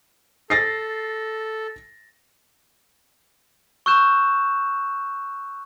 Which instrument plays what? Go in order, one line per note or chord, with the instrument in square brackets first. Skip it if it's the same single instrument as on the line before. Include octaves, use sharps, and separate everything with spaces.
[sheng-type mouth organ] A4 [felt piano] A6 A#6 C7
[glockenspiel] C#6 E6 F#6 G6 E7